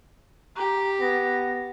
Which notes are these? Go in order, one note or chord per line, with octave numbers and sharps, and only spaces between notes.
G4 A#5
B3 A#6